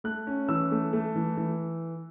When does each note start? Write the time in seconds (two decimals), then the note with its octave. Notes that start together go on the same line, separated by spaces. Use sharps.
0.04 A3 F#6
0.27 C#4
0.49 E3 E6
0.71 A3
0.93 A3
1.16 E3
1.37 E3